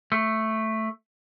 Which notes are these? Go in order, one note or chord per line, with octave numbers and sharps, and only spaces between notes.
A3